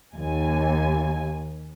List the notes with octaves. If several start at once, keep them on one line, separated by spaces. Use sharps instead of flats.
D#2 G#5